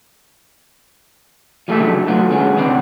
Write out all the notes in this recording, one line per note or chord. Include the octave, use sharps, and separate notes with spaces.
F3 G3 A3 A4 E5
C#3 F#3 D4 D#4
F#3 A3 B3 F4
D3 G#3 B3 C#4
C2 D#3 B3 C4 D4